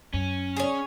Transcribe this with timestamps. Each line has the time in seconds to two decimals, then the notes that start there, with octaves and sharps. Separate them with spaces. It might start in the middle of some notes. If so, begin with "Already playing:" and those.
0.14 F#2 C#4
0.56 G#4 C#5